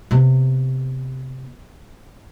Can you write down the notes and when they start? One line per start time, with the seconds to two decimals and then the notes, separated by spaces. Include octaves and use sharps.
0.11 C3 B3